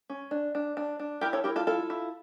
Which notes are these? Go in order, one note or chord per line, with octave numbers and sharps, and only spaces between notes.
C#4
D4
D4
D4
D4
E4 G4 A#4
A4 C#5
E4 G4 A#4
F4 A4
E4 F4 A4
E4